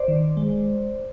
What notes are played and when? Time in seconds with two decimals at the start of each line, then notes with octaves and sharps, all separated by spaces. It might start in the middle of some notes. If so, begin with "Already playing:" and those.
Already playing: C5 D5
0.08 D#3
0.37 G#3